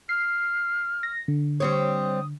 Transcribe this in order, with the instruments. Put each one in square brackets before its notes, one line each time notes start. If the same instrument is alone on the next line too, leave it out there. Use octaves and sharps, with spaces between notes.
[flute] F6 [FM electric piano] C7
[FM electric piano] A#6
D3
[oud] G3 C4 C#5 [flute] D#6